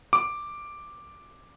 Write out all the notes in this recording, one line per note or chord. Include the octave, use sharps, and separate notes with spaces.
D6